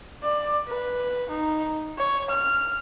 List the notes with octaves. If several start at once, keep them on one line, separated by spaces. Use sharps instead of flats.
D5
B4
D#4
C#5
F6